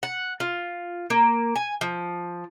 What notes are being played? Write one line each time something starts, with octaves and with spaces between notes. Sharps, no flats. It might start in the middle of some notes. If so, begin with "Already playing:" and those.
F#5
F4
A#3
G#5
F3